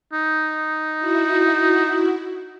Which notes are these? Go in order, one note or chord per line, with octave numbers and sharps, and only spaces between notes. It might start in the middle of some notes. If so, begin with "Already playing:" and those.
D#4
E4 F#4